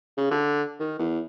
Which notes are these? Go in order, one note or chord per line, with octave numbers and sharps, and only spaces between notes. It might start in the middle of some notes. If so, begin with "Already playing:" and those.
C#3
D3
D#3
E2